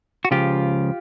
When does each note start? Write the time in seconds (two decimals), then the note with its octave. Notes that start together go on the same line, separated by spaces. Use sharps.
0.25 F#4
0.31 C#2 C#3 F3 F4 G4